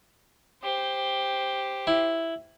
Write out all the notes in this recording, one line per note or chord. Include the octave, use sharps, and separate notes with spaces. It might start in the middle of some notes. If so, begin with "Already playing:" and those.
G4 C5
E4